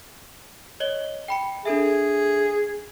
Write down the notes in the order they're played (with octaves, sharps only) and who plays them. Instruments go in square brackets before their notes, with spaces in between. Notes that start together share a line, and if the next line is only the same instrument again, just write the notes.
[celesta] C#5 D#5 G7
G5 B5 C#7
[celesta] D4 A4 E5 [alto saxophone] G#4